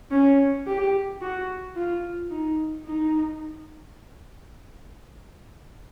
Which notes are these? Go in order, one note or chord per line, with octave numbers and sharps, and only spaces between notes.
C#4
G4
F#4
F4
D#4
D#4